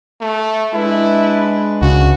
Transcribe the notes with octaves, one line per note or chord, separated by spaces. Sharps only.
A3
G#3 D4 E4 B4
C#2 C#3 F#4